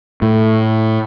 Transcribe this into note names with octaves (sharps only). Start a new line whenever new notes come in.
A2